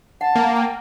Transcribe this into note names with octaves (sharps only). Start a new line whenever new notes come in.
F#5 A5
A#3
G5